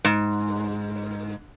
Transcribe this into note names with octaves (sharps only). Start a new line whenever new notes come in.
G#2